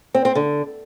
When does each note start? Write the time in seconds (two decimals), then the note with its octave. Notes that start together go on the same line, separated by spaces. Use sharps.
0.14 C4
0.25 C4
0.35 D3